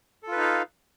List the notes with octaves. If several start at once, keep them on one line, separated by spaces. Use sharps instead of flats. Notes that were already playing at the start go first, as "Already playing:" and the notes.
D#4 F4 A4 B4 F5